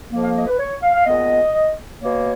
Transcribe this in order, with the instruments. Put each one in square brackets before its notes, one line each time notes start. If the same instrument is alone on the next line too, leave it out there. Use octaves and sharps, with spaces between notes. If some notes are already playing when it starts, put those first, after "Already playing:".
[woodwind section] F2 F3 A#3
F5
D#5
B4
C#5
F5
F5
A#2 G#3 B3 D#5
B2 A#3 C#5